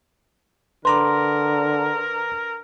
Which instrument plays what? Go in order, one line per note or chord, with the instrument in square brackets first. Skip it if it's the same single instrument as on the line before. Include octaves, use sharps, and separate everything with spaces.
[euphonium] D3 [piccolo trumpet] A#4 [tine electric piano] B4 A#5 D6 [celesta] C6